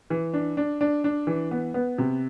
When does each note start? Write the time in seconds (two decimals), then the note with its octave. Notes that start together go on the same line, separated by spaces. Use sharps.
0.10 E3
0.34 D4
0.57 D4
0.81 D4
1.04 D4
1.27 E3
1.51 B3
1.74 B3
1.98 C3